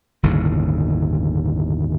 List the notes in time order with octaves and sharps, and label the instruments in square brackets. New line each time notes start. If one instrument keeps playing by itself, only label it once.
[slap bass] G1 D#2 A2 C#3